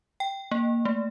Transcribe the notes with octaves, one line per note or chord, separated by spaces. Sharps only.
G5
A#3
A3